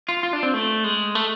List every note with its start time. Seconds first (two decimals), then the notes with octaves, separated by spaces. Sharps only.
0.09 F4
0.23 F4
0.33 D4
0.43 C4
0.54 A3
0.84 G#3
1.15 A3